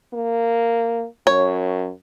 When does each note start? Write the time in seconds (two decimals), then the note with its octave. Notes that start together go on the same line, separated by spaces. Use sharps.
0.14 A#3
1.27 F#2 C#5